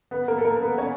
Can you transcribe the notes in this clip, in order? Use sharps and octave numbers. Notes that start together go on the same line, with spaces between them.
B3 B4
A#3 A#4
A4
A#3 A#4
B3 B4
C#4 C#5